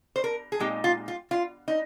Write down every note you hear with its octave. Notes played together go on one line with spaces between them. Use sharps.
C5
A#4
G#4
A#2 G#3 C4 D#4 G4
F4
F4
F4
D#4